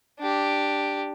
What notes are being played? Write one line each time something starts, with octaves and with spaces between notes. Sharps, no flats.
D4 G4